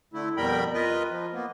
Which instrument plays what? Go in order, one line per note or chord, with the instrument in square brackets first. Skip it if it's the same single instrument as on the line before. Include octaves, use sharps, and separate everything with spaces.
[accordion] D3 A3 E4
F2 B2 G3 A#4 G5 B5
F4 A#4 B4 D#5
F3
A#3 B3